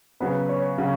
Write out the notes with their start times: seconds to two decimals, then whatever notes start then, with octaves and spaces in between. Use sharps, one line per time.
0.20 C#3 F#3 B3 B4
0.49 C#5
0.78 C#3 F#3